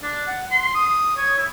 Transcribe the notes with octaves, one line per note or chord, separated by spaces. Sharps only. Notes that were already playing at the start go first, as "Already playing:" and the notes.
D4
F#5
C6
D#6
C#5
E4